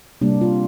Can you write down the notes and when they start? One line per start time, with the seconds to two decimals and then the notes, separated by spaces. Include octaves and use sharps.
0.21 C3 G3 A#3 D4
0.41 F4